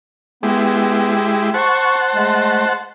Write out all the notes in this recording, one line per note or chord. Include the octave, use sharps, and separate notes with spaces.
G#3 B3 E4 G4
C5 F#5 A5 C#6
G#3 A3